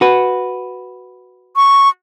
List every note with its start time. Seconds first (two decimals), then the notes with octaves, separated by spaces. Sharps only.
0.01 F#4 B4
1.56 C#6